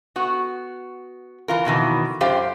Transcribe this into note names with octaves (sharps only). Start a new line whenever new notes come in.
B3 F#4
E3 F4 A#4
F2 B2 D#3 E3
F#2 F4 G4 C5 F5 G5